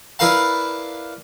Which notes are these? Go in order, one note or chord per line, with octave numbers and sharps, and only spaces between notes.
D4 E4 A#4 B4 F5 A5